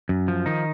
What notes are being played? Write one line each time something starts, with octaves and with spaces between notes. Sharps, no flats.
F#2
F3
D#3 D#4